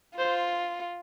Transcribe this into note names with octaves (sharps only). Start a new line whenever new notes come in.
F4 C5